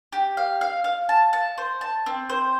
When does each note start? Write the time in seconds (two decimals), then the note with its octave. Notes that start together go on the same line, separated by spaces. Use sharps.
0.13 G4
0.37 F5
0.61 F5
0.84 F5
1.09 A5
1.33 A5
1.58 C5
1.81 A5
2.06 C4
2.30 C5